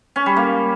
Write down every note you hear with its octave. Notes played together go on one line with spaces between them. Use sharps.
C#4
G3
A#3